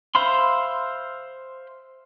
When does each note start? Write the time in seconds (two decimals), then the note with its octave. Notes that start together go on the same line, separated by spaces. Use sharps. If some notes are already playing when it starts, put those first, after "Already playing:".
0.15 C5 E5 F5 B5 C6